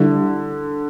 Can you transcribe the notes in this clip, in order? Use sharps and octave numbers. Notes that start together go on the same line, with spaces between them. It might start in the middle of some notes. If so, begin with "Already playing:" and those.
Already playing: D3 G3 E4 G4